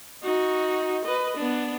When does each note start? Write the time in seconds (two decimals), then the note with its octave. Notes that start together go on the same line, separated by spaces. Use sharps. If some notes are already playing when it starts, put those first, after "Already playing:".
0.23 D#4 F#4
1.05 B4 D#5
1.37 B3 D4